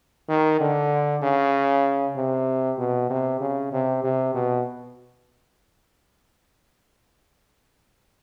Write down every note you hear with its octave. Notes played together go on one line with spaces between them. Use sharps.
D#3
D3
C#3
C3
B2
C3
C#3
C3
C3
B2